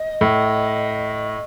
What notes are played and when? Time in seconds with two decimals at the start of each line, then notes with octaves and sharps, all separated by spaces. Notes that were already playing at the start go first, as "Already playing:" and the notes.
Already playing: D#5
0.21 A2